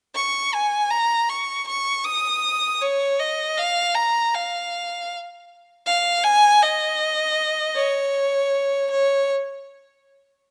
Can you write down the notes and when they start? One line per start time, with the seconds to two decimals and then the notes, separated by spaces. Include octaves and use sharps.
0.15 C#6
0.54 G#5
0.91 A#5
1.29 C#6
1.68 C#6
2.05 D#6
2.82 C#5
3.20 D#5
3.57 F5
3.95 A#5
4.34 F5
5.86 F5
6.23 G#5
6.62 D#5
7.76 C#5
8.90 C#5